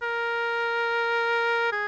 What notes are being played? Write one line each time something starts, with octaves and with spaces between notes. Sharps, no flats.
A#4
G#4